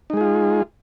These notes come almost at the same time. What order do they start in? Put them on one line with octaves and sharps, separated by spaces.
D#4 G#3 G#4 F4